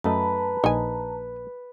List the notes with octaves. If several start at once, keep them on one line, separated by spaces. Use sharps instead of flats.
F#2 A3 B4 D#5 A5 A#5
A#1 D#4 G#5